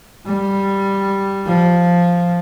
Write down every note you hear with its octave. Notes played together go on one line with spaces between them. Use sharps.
G3
F3